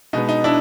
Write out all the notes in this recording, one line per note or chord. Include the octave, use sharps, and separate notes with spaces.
B2 G#3 B3 D#4
D#4
D4 E4